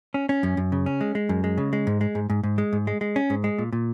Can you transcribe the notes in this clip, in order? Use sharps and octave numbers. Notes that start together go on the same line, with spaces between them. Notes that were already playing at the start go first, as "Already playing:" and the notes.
C#4
C#4
F#2
F#2
C#3
C#4
G#3
G#3
F#2
G#3
C#3
G#3
G#2
G#3
G#2
G#2
G#2
G#3
G#2
G#3
G#3
C#4
G#2
G#3
A#2
A#2